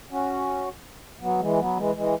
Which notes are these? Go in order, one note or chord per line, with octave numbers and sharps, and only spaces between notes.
C#4 F#4
F#3 B3
E3 G#3
F#3 B3
E3 G#3
E3 G#3